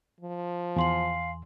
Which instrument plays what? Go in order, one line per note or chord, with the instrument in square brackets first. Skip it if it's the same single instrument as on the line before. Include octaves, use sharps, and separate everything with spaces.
[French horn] F3
[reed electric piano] E2 [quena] F5 [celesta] G#5 C6 F#7